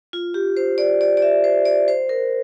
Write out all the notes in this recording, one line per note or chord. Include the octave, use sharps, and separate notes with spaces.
F4
G4
C5
D5
D5
D5
E5
C5
D5
C5
A#4